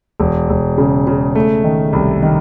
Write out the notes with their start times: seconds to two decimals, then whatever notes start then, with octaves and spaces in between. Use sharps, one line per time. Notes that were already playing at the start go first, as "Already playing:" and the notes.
0.20 E1
0.50 E1
0.78 C#3
1.07 C#3
1.35 A3
1.64 D#3
1.93 C2
2.23 D#3